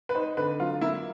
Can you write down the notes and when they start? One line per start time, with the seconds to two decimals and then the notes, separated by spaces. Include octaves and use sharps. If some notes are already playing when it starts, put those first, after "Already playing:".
0.09 B4
0.15 D#4 C5
0.37 D3 B4
0.60 F#3 F4
0.81 A#3 E4